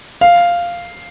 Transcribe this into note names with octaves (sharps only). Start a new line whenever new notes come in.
F5